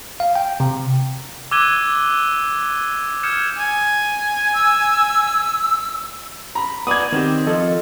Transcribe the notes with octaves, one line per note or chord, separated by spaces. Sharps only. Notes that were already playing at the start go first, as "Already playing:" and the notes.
F5
G5
C3
D6 E6 F#6 G#6 D#7 G7
D#6 F6 G6 G#6 C#7 E7
G#5
E6
A#5 B5
B3 D5 D#6 G#6 D#7
D#3 C4 G4
F2 F4 A4 D#5